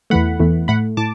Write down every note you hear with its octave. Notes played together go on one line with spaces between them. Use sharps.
E2 E3 A3 F#5 B5
E2 E3 A3
A2 A3 F#5 B5
A2 A5 D6